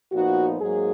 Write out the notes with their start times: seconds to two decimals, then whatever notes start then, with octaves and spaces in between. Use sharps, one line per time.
0.12 A#2 F3 B3 D#4 F#4
0.60 G#2 F#3 A#3 G#4